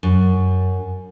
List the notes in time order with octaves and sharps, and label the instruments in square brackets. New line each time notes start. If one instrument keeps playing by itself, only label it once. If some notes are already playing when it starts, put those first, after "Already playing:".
[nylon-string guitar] F#2